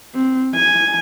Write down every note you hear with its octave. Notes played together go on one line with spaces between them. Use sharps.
C4
G#5